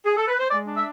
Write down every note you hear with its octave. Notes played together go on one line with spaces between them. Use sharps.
G#4
A4
B4
C5
G#3 D5
D4
E5